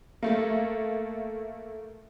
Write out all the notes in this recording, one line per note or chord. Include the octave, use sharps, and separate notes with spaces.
A3 A#3